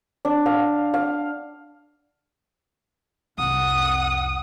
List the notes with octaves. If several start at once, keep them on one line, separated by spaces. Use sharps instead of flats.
D4
F5
F5
C2 F2 F#5 D#6